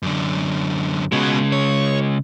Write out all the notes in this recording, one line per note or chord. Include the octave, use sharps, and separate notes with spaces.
F#2 D3
C#3 G#3 B3 F#4
C#5